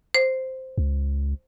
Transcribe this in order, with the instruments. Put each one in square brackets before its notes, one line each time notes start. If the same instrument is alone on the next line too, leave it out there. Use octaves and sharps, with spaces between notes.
[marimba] C5
[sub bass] C#2